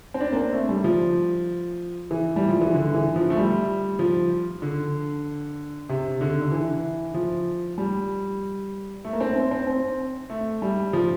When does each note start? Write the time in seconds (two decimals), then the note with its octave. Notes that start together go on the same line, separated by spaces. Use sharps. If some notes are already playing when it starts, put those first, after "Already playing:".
0.14 C4
0.21 D4
0.32 A#3
0.37 C4
0.53 A3
0.69 G3
0.84 F3
2.11 E3
2.36 G3
2.49 F3
2.61 E3
2.74 D3
2.94 E3
3.16 F3
3.30 A3
3.37 G3
3.99 F3
4.62 D3
5.89 C3
6.21 D3
6.42 D3
6.52 E3
7.14 F3
7.78 G3
9.05 A3
9.13 A#3
9.20 C4
9.36 C4
9.51 C4
9.67 C4
10.30 A3
10.62 G3
10.93 F3